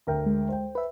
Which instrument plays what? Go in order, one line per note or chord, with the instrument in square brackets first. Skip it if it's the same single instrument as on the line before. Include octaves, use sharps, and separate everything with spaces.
[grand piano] D2 A#4 G5
[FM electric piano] G#3
[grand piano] C5 G5
[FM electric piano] B4 E5